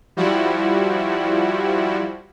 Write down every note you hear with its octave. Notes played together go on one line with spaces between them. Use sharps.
F3 G3 E4 F#4